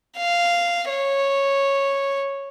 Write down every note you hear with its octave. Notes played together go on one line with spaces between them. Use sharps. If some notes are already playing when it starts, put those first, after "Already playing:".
F5
C#5